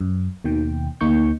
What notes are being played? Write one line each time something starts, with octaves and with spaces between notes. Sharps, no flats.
F#2
D#2 B2 D#3 G5
D2 A#3 D#4 C#6 G6